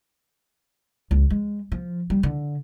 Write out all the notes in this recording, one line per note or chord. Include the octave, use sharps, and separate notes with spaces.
C#2
G#3
F3
G3
D3